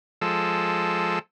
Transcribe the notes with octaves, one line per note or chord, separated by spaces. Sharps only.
F3 G#3 A4 E6